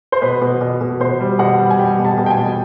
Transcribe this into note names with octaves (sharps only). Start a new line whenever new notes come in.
C5
B2 B4
B2
B2
B2
B2 C5
G3
B2 F#5
G3
G#5
G3 G5
B2
A5
B2
G5
G#5
B2